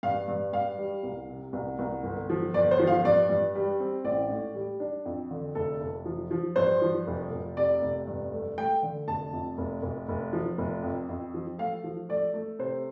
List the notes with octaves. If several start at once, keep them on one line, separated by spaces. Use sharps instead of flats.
G2 F5
G2
G2 F5
G3
C2
C3
C2
C2
G1
F3
G1 D5
C5
F3
F5
G2 D5
G2
G3
C4
A1 D5
A2
G3
D4
F2
D3
F1 A4
F1
F3
F3
G2 C5
F3
F1
F1
C3 D5
F1
G2
A3
A3 G5
D3
F1 A5
F2
F1
F1
F1
F3
F1
F2
F2
F3
A3 F5
F3
A3 D5
A3
C3 C5